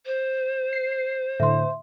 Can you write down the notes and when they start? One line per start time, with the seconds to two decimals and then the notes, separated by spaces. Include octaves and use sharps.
0.06 C5
0.73 C7
1.40 A2 D3 E5 C6